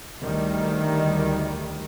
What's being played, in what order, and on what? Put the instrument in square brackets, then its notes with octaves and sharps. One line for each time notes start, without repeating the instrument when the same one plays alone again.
[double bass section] D2 D#3 G3